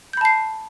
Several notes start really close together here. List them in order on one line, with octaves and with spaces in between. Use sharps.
G6 B5 A5 C7